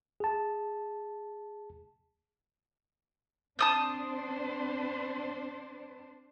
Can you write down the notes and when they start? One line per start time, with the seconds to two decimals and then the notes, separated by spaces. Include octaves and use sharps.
0.20 G#4 A5
3.59 C4 D4 C5 A5 D#6 G6